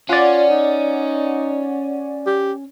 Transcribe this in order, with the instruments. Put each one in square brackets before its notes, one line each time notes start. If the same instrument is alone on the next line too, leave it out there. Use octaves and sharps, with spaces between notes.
[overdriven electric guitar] C#4 [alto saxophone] F4 [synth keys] D5 F#5
[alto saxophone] D#4
G4